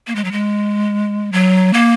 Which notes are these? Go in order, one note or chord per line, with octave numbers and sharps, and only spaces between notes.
A#3
G#3
F#3
G#3
F#3
A#3